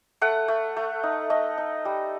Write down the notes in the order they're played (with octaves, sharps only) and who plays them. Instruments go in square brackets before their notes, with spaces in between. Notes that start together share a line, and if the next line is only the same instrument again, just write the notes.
[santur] A3 F#5
A3
A3
D#4
A3 D#5
D#4
G3